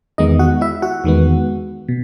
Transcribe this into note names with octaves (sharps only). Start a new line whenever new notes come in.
E2 D#3 G#3 B3 D#4 D#5
F#4 F#5
E4 E5
F#4 F#5
E2 D#3 G#3 B3
B2